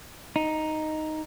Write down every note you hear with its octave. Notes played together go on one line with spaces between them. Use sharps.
D#4